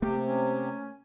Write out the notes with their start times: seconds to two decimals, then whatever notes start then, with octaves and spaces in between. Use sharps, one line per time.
0.02 C3 A3 A#3 G4
0.24 C#4